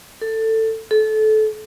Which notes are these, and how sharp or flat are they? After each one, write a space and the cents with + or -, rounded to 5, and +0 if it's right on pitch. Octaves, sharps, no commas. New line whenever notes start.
A4 +15
A4 -25